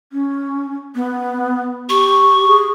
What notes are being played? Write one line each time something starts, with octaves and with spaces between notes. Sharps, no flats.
C#4
B3
G4 C#6
G#4